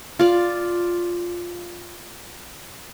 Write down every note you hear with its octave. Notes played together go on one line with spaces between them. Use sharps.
F4 D5